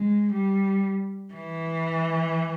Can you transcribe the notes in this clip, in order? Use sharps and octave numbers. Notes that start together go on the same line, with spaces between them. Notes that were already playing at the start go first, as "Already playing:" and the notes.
Already playing: G#3
G3
E3